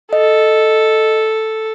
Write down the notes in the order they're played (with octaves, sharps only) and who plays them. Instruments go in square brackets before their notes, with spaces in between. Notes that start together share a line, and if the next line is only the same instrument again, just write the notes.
[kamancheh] A4 [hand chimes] D#5